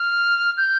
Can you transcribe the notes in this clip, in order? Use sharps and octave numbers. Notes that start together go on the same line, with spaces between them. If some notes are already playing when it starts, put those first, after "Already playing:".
Already playing: F6
G6